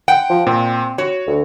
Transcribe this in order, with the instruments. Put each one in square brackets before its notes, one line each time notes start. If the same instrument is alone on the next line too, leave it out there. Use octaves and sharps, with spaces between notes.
[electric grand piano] F#5 [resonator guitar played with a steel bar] G5
[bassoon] F3
[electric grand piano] A#2 [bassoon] C4
[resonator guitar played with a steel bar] F#4 [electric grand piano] C#5
[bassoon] D2